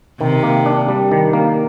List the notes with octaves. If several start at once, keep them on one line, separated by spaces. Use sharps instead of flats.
C3 D#3
A#3
D4
G3
D#3
A#3